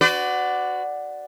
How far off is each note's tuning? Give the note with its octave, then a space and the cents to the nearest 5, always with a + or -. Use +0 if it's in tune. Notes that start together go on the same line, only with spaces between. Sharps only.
F#4 +0 B4 +40 D5 +0